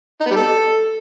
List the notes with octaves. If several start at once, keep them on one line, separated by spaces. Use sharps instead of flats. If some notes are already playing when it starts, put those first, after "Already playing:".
D#4
B3
G3
A4